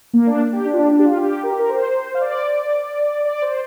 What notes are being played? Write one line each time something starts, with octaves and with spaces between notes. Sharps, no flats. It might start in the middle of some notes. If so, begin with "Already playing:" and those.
A#3
D4
G4
D4
F4
D4
D4
G4
F4
G4
A#4
G4
A#4
C5
F5
D5
D5
C5